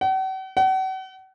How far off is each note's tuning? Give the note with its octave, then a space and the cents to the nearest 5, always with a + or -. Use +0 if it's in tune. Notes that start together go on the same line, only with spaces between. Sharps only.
F#5 +45
F#5 +40